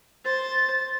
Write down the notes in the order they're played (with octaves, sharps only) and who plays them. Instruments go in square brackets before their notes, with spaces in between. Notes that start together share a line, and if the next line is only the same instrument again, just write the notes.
[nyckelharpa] C5 [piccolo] A6